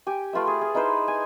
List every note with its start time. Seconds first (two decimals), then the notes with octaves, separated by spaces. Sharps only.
0.07 G4 G#5
0.33 A3 F4 B4 E5
0.47 G#4
0.61 G#4
0.75 D#4 E4 B4 C5
1.08 G#5